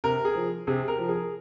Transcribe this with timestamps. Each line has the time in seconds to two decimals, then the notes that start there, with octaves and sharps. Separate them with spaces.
0.04 C3 A#4
0.25 G#4
0.35 F3
0.67 C3 G#4
0.88 A#4
0.98 F3
1.09 G#4